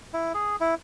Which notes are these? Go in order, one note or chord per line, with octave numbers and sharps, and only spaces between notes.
E4
G#4
E4